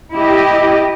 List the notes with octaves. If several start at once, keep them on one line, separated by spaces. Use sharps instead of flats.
E4 G4 D#5